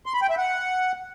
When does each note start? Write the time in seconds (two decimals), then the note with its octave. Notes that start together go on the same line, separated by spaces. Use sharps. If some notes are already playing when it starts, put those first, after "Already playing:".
0.06 C6
0.14 B5
0.22 G5
0.30 E5
0.38 F#5